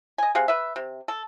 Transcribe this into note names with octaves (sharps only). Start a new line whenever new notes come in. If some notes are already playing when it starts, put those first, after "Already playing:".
D#5 G#5
C3 G#4 F5 F#5
B4 E5
C3
A4